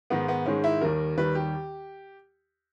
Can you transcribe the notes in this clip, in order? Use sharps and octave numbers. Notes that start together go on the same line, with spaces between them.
G#2 D#3 G#3 B3
B3
G#2 D#3 G#3 C#4
E4
D#2 D#3 G3 A#4
D#2 D#3 G3 B4
G4